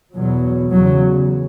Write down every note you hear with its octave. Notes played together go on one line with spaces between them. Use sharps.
E2 B2 F#3
E2 C#3 F#3